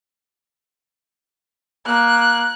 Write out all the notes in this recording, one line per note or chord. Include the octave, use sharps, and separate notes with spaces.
A#3 F#6